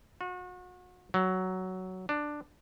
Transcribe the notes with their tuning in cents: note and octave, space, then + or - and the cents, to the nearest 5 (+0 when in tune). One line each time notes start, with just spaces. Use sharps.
F#4 -35
F#3 +10
D4 +10